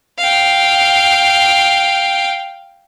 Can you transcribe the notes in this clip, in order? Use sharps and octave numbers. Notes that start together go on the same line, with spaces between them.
F5 G5